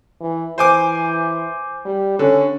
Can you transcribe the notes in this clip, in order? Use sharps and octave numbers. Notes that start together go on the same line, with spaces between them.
E3
E3 C5 G#5 D6
G3
D3 C#4